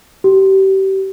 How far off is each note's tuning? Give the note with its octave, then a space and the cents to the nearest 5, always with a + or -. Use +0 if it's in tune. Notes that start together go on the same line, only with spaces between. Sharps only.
G4 -30